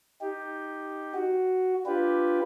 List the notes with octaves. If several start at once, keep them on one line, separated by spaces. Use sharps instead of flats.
D#4 G4
F#4
D4 F4 G4 B4